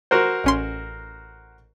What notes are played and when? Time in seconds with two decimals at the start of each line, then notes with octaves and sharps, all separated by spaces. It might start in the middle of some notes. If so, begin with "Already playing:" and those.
0.11 F#4 A#4 C5
0.44 A1 C#4 C6